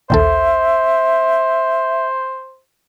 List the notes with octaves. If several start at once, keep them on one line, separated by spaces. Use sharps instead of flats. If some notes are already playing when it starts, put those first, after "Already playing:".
A#1 D#2 A4 C5 E5